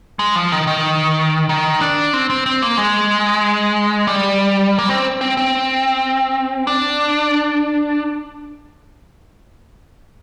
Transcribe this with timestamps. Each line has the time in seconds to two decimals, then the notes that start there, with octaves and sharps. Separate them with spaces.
0.19 G#3
0.36 F3
0.52 D#3
0.67 D#3
1.49 D#3
1.81 D4
2.13 C4
2.30 C4
2.46 C4
2.62 A#3
2.78 G#3
4.07 G3
4.78 A#3
4.89 C4
5.21 C4
5.37 C4
6.67 D4